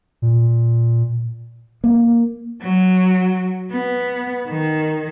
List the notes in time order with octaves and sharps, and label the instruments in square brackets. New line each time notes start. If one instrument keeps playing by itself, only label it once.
[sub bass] A#2
[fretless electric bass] A#3
[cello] F#3
B3
D#3